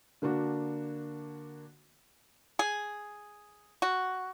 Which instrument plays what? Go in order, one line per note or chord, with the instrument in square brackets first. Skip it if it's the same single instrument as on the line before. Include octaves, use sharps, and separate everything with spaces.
[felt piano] D3 A#3 D4 F#4
[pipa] G#4
F#4